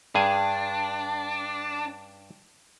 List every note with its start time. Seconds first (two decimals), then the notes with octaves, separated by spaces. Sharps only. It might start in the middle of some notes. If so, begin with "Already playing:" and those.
0.15 G2 D4 G#4 G#5